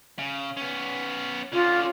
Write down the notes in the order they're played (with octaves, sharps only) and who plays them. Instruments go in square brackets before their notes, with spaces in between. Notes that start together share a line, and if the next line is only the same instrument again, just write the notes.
[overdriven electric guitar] C#3
B3 C#4
[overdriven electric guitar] D3 C#4 [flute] F4